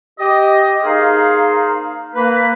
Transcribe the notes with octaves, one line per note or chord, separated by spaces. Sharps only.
G4 D#5
A#3 D#4 G#4 C5 F5
A#3 B4